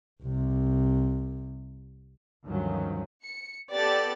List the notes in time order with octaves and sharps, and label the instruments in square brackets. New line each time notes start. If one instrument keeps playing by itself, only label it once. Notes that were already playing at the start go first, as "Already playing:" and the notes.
[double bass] C2 C3
[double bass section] D2 G2 D#3 F3 F#3 C#4
[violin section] C#7
B3 G4 A4 D5 A6